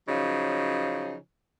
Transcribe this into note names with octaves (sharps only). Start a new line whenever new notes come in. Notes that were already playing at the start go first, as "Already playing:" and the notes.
C#3 F3 F#3 D#4